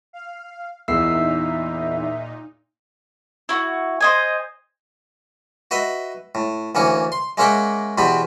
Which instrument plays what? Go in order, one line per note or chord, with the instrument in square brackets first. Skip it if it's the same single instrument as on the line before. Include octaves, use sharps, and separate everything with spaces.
[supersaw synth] F5
[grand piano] E2 [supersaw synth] A#2 D#4 [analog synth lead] E5 [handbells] E6 C7
[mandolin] E4 F#4
C5 D#5 G#5
[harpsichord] F#4 B4 D#5 E5
A2
D2 E3 A#3 C#4 C#6
C6
G#3 A#3 C#4 E5 F#5 G5
E2 B2 B3 C4 G4 B5